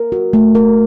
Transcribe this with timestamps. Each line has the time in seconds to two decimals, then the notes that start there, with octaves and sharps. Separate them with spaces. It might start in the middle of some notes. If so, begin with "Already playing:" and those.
Already playing: A#4
0.12 F#4
0.33 A3
0.55 A#4